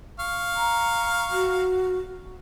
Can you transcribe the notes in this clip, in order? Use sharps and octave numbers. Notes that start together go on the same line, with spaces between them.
F5 C#6
A#5
F#4